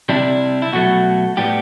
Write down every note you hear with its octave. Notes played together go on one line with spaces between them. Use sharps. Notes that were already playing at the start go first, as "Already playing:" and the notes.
C3 G3 D4 E4
E4
B2 F#3 A3 F#4
A2 G3 B3 G4